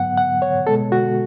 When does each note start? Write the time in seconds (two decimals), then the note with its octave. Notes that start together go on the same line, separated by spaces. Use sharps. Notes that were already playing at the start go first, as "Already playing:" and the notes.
Already playing: G#2 F#3 B3 F#5
0.17 F#5
0.42 C#5
0.67 B2 G#3 B3 A4
0.92 F#4